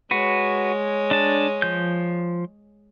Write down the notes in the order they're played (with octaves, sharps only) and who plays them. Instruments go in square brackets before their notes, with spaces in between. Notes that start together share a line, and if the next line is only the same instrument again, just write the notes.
[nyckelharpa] G#3 C#5 [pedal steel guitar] F#4 B4
[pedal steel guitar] D4 A5
F3 G6